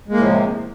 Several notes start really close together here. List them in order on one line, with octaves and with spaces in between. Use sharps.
G#3 A#3 A2 F3 C3